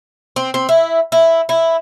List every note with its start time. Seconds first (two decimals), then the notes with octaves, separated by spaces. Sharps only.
0.36 C4
0.54 C4
0.69 E4
1.12 E4
1.49 E4